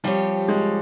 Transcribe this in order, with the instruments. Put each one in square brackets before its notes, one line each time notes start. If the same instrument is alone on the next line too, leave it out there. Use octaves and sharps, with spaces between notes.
[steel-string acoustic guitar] F3 C4 G4 C#5 [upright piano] G3
[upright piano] G#3